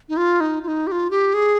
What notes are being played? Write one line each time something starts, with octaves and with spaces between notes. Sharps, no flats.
D#4
F4
D#4
F4
D#4
G4
F4
G4
G#4